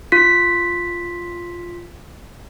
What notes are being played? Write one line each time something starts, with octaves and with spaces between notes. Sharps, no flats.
F4 B6